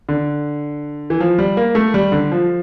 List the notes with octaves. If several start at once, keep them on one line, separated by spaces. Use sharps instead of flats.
D3
E3
F3
G3
A#3
A3
G3
D3
F3